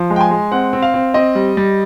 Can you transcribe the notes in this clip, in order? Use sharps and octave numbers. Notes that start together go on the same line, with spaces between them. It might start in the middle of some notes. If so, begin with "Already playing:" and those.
Already playing: F3
G#3
G5
G#5
G#3
C4 F#5
C4
F5
C4
C4 D#5
G3
G3